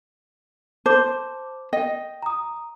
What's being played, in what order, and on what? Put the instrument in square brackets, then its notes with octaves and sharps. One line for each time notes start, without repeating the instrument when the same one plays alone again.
[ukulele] C5 [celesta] A5 D6
[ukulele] D#5 [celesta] G5
[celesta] A#5 D#6